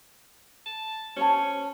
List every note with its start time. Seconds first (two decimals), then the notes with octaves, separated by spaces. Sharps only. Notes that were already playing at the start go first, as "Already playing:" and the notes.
0.66 A5
1.17 C#4 C5 C#5 A5